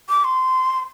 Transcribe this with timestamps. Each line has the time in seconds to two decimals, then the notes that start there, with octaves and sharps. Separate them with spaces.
0.09 D6
0.24 C6